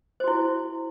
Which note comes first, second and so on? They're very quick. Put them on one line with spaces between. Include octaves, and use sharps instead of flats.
C5 F#4 E4